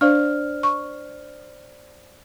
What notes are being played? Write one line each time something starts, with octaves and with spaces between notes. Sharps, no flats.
D4 C5 D5 F5 F6
C#6